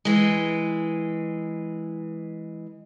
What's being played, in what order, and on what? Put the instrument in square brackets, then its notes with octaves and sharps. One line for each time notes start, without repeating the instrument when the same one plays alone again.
[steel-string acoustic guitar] E3 G#3